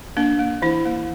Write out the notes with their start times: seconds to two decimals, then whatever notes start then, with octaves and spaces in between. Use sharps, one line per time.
0.17 A#3 D4
0.39 A#3
0.62 E3 E4
0.86 A#3